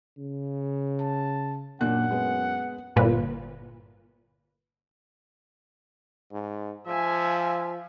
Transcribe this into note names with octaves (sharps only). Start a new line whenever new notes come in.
C#3
A5
F#2 A#2 D4 F#5 F#6
G#3 B3
G1 A#2 B4
G#2
F3 E5 G#5